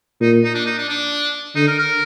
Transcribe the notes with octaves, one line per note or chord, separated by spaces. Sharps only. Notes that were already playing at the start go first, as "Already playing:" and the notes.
A#2 D#4
D#4
D4
D#4
D4
D4
D3 D#4
A#4
A#4